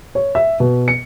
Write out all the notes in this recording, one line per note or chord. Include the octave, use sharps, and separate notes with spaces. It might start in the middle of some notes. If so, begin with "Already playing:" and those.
C#5
E5
B2
C#7